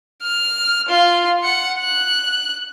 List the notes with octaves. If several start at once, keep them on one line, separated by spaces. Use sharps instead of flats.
F6
F4
F#5 C#7
F#6